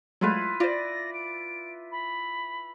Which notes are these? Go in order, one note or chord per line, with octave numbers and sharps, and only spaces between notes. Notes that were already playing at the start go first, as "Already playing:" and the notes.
F#3 G#3 A3 E4 F4 B4
F4 C5 D5 A#6
D7
B5